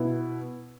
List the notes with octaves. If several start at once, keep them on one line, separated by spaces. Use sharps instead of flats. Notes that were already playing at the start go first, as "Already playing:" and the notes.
Already playing: B2 B3 E4